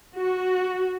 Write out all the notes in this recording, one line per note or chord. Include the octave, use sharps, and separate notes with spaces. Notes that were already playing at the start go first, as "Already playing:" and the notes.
F#4